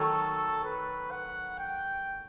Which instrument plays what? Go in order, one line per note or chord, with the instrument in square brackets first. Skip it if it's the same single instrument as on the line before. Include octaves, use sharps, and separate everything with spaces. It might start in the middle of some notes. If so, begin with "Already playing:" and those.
Already playing: [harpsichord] D#3 F#3 A3 [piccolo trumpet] A4
[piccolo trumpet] B4
F#5
G5